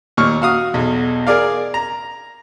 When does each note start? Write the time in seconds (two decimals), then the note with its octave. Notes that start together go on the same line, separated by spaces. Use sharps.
0.17 D#2 A#2 C#6 F6
0.42 F#4 F5 D#6
0.74 B1 E2
1.27 G#4 A#4 D5 F5
1.74 A#5